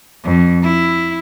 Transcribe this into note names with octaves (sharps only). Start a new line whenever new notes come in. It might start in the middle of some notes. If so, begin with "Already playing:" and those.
F2
E4